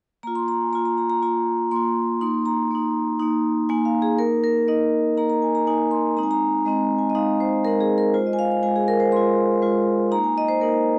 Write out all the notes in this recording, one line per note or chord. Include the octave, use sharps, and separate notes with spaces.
A#3 F4 A#5
C6
A#5
G#5
A#3 F4 A#5
A#5
A#5
A#5
A#3 F4 A#5
A#3 F4 C6
A#3 D#4 C6
A#5
A#3 D#4
A#3 D#4
A#3 D#4 G#5
F5
G#4
A#3 D#4 A#4
A#4
A#3 D#4 D#5
A#3 D#4 A#5
A#5
G#5
A#5
A#3 D#4 G#5
C6
G#3 C4 D#4 A#5
G#5
A#5
G#3 C4 D#4 D#5
G#5
D#5
G#3 C4 D#4 F5
C5
G#3 C4 D#4 A#4
G#4
A#4
G#3 F4 C5
D#5
G#5
F5
F5
G#3 F4 G#5
G#4
A#4
C5
G#3 F4 C6
G#3 F4
A#3 D#4 A#5
G#5
D#5
C5
A#3 D#4 A#4